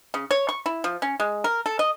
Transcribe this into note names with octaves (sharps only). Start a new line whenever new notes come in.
C#3
C#5
C#6
E4
F3
C#4
G#3
A#4
A4
D#5